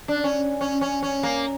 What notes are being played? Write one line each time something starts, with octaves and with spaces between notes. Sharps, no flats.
D4
C#4
C#4
C#4
C#4
A#3